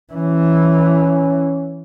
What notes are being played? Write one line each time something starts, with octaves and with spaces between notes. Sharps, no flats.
E3 C#4